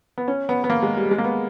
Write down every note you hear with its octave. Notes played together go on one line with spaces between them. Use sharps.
B3
C#4
B3
B3
A#3
G#3
G3
G#3
A#3
B3